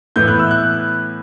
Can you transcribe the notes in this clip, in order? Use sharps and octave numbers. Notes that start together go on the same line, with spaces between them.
A2 E3 B3 E4 G6
F#6
E6
F#6